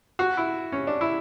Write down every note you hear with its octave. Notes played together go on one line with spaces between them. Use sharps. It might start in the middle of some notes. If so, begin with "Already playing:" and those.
F#4
E4
C#4
D4
E4